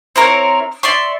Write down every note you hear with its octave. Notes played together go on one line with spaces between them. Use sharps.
C4 E4 A#4 C#5
D5 E5 C6 C#6